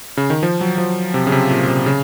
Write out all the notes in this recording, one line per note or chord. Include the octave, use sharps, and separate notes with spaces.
C#3
D#3
F3
F#3
F3
C3
C#3
C3
A#2
C3
C#3